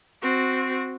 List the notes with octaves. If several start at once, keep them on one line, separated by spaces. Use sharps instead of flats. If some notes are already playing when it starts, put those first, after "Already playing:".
C4 F#4